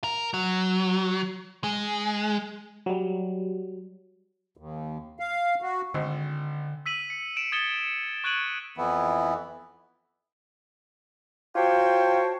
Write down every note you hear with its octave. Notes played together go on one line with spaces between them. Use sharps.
A#4
F#3
G#3
F#3 G3
D#2
F5
F#4
G#1 D3
E6 B6 D#7 F#7
C#7
D7 E7
D#6 G#6 A6 C#7 E7 G7
C#6 F#6 G#6 D7 D#7 F#7
F2 E3 B3 E4
F4 F#4 C5 C#5 G5 A5